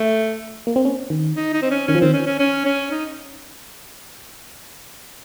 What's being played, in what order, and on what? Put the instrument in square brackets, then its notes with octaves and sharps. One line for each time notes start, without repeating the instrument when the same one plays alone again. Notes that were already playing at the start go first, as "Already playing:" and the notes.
Already playing: [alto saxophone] A3
[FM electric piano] A#3
C4
C#4
D#3
[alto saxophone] D#4
D#4
C4
C#4
[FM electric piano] D#3 [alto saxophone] C#4
[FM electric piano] F3
[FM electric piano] D#3 [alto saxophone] C4
[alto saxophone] C#4
C#4
C#4
C#4
D#4